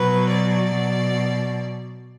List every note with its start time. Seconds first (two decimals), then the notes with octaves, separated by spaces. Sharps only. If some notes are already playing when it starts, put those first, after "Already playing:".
Already playing: B2 F#3 B4
0.29 D5
0.71 B2 F#3